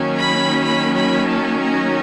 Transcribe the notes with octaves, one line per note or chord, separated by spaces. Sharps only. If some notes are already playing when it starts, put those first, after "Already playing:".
Already playing: D#3 F#3 A#3 C#4
B5
B5
B5
A5
A#5